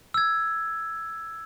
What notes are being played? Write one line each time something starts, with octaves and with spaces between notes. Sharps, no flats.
E6 G#6